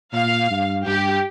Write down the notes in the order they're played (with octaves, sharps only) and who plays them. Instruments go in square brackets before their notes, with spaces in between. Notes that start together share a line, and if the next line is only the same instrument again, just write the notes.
[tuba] A#2 [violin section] F5
[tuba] G2
[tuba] G2 [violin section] G4